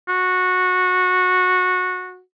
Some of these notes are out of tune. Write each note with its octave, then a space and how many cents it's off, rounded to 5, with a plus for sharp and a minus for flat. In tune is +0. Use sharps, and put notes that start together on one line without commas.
F#4 -15